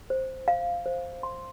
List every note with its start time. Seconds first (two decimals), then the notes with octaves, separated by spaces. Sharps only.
0.10 C5
0.48 F5
0.86 C5
1.23 C6